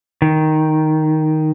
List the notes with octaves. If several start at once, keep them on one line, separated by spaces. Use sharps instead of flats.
D#3